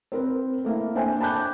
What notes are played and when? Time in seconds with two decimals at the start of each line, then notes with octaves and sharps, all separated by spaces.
0.12 C4 A#4 B4
0.65 A3 A#3 E4
0.95 D4 A4 C5 E5 G5 G#5
1.21 A5 B5 D6 F#6 G6